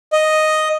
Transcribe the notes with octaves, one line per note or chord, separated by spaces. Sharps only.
D#5